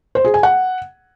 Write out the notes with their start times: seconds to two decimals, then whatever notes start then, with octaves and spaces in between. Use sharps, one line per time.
0.15 C5
0.25 G#4
0.34 G#5
0.43 F#5